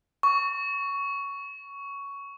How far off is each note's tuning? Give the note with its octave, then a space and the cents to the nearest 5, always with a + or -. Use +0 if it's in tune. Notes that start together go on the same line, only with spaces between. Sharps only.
C#6 +10